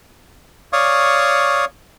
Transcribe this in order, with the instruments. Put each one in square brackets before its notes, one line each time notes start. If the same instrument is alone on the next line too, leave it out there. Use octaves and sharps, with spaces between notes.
[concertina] C#5 D5 F5 C#6 D#6